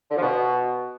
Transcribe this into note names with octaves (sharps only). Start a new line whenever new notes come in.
D3
F3
B2